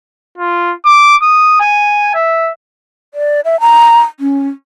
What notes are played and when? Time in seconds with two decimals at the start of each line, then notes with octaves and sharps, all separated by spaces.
0.38 F4
0.85 D6
1.22 D#6
1.60 G#5
2.15 E5
3.14 D5
3.45 E5
3.61 A#5
4.20 C#4